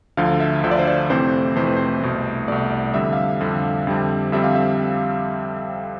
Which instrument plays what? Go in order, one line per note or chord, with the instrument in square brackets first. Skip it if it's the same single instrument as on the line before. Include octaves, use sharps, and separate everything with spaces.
[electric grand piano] D2 D3 F3 F5
E5
D2 D3 F3 E5
D5
C5
D5
F2 C3 E3 A3 C4 C5
F2 C3 E3 A3 C4 C5
B4
C5
C2 B2 A3
C2 B2 A3 D5
F2 D3 G3 E5
F5
E5
F2 D3 G3
F2 D3 G3 C4
F2 D3 G3 C4 E5
F5
E5